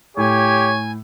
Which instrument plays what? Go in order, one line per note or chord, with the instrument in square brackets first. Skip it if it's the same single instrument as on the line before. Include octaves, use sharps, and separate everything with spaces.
[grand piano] A2 [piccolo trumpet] G4 [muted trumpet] C#5 [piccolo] G#5